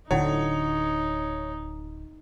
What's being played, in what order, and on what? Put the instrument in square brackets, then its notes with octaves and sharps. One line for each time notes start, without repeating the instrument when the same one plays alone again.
[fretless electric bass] D1 D2 D3 [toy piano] C#4 E4 F#5 [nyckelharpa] D#4 [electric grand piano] C#5